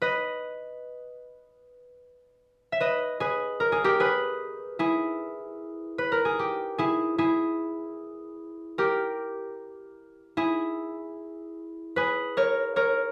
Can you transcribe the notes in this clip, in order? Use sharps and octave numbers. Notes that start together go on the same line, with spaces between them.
B4 D#5
E5
B4 D#5
G#4 B4
A#4
G#4
G4 A#4
G#4 B4
E4 G#4
B4
A#4
G#4
G4
E4 G#4
E4 G#4
G4 A#4
E4 G#4
G#4 B4
A#4 C#5
A#4 C#5